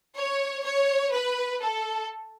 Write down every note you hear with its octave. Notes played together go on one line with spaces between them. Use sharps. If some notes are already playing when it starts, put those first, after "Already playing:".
C#5
C#5
B4
A4